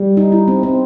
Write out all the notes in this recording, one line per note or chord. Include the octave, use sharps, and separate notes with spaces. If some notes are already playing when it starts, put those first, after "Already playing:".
Already playing: G3
D#4
E4
C4
C4